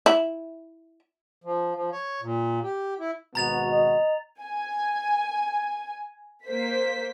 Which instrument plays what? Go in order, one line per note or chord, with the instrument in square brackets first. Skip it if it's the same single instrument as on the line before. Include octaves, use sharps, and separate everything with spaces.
[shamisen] E4
[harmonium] F3
F3
C#5
A#2
G4
E4
[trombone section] G#1 B2 F#4 [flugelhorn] B3 [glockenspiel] A#5 A6 F7
[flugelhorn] D#5
[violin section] G#5
A#3 C5 B6